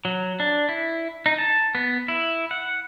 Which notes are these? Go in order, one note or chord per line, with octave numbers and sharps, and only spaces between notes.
F#3
D4
E4
D#4
A5
B3
E4
F#5